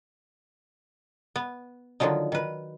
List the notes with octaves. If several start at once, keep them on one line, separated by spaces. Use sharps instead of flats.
B3
D3 D#3 F3 F#3 D#4
D#3 B4